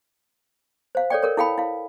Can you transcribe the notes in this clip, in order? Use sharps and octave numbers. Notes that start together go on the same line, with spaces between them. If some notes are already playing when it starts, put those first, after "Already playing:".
C5 F5
A4 C#5 D5 G5
A4 A#4 C#5
E4 A4 F5 G5 B5
E4 F5